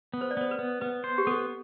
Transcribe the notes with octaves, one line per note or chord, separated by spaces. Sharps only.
B3
C5
D5
B3 C5
B4
B3
B3 B4
C5
G4
B3 A4